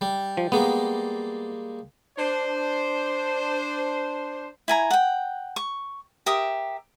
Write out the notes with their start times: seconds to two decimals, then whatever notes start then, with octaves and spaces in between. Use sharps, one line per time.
0.01 G3
0.37 F3
0.52 G3 G#3 A#3 B3
2.18 D4 C5
4.68 E4 G#5 A#5
4.90 F#5 G5
5.56 C#6
6.26 G4 A#4 E5 D#6